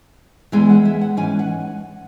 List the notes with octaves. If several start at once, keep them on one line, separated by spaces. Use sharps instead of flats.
E2 E3 G#3
F#5
E5
F#5
G#2 E3 C#4 G#5
F#5